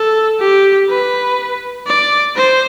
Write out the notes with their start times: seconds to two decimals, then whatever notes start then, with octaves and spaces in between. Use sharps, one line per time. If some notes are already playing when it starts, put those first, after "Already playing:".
Already playing: A4
0.40 G4
0.89 B4
1.87 D5
2.36 C5